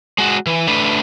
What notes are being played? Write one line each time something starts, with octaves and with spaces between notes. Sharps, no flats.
G#3 F#4
E3
A3 D4 B4